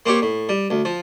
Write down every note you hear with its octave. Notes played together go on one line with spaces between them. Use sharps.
A#3 C4 G4 C#5
A2
G3
D2
F3